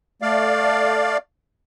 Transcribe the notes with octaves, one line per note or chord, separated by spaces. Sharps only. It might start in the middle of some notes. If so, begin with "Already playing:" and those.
A3 D5 F5